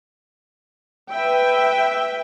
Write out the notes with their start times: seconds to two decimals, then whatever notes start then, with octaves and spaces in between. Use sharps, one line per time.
1.12 B4 E5 G5